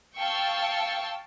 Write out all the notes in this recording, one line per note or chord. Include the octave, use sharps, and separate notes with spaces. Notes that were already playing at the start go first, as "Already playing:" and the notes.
F5 G5 A5 C#6 E6